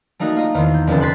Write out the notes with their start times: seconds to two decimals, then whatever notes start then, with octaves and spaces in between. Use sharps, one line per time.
0.19 G3 A3 A#3 D#4 F#4
0.37 F4 D#5
0.54 E2 D#3 F4 C5
0.74 G6
0.87 F1 D2 C#4 A4
1.00 C6 F#6 G#6 A6 B6 C7